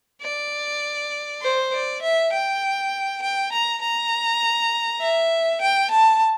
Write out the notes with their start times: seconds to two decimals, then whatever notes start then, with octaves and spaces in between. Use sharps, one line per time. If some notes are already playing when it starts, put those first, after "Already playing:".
0.22 D5
1.42 C5
1.73 D5
2.02 E5
2.33 G5
3.22 G5
3.52 A#5
3.82 A#5
5.01 E5
5.61 G5
5.91 A5